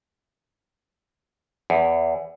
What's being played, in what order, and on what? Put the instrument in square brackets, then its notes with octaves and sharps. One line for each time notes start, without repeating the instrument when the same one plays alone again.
[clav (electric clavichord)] E2